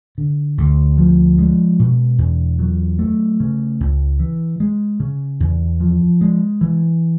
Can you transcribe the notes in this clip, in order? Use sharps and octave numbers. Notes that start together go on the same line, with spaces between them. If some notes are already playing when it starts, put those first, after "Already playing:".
D3
D2
F3
G#3
B2
E2
F#3
A3
C#3
C#2
E3
G#3
C#3
E2
F3
G#3
E3